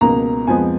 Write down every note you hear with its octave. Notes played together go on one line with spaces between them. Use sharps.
C#2 B2 A#3 A#5
F2 F3 G#3 B3 G#5